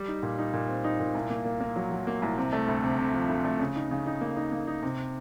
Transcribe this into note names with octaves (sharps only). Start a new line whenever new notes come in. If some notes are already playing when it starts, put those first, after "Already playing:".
Already playing: G3
D#4
A#2
D#4
A#2
C4
D#4
A#2
C2
A#3
A#3
A#3
F#3
F#3
A#3
C2
C3
A3
D2
C3
C3
F3
D2
A3
C#3
D#4
C#3
D#4
A#3
D#4
A#3
D#4
C3